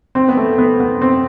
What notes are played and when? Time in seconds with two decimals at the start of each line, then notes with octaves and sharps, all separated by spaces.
0.15 C4
0.28 B3
0.37 A3
0.58 B3
0.80 B3
1.02 C4